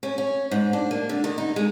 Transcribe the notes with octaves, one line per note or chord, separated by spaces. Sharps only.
C#4
C#4
G#2
D4
A#3
D3
D#3
D#4
G#3